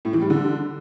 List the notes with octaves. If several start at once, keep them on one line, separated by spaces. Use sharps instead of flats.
A2
E3
G3
D3